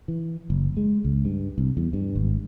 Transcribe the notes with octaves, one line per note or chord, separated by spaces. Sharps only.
E3
F#1
G#3
C#2
G2
C2
E2
G2
G#1